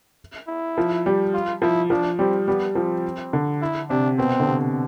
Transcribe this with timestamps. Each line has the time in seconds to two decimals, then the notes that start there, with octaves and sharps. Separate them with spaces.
0.48 E4
0.78 F3
1.06 G3
1.34 F4
1.62 F3 E4
1.90 F3 D4
2.19 G3 C4
2.48 G3 B3
2.75 F3 C4
3.33 D3
3.62 E4
3.89 C3 D4
4.18 B2 C4
4.40 D3
4.46 C3